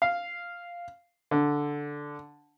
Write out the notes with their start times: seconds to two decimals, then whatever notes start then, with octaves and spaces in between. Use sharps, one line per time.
0.02 F5
1.31 D3